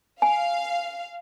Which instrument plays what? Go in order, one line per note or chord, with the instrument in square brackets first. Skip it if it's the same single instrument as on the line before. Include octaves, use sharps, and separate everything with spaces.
[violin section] F5 [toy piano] G#5